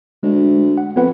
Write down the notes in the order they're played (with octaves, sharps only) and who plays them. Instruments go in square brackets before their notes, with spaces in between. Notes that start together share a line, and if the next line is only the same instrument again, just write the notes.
[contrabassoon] D2 [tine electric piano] G#3
[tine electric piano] F#5
[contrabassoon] F2 [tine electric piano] B3 B4 F#5